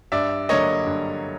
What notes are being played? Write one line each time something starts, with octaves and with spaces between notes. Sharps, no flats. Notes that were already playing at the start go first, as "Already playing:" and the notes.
G2 D5 E5
D3 F#3 A#3 C#5 D#5
G2